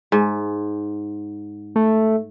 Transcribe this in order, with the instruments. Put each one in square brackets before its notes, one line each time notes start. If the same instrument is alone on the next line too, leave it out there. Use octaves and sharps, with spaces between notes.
[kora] G#2
[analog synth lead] A3